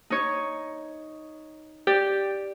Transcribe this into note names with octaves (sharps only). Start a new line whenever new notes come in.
D#4 C#5
G4 D5